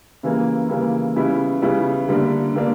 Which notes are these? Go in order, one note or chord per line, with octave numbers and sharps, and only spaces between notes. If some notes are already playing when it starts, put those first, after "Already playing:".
C#3 E3 G3 A#3
C#3 E3 G3 A#3
C#3 G3 B3 E4
C#3 G3 B3 E4
D3 G3 A#3 D4
D3 G3 A#3 D4